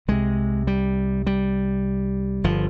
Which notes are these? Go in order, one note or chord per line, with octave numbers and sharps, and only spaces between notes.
C2 C3 G#3
G3
G3
G1 F3